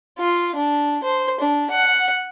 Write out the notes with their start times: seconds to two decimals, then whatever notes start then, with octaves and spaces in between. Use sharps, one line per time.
0.18 F4
0.55 D4
1.03 C5
1.40 D4
1.70 F#5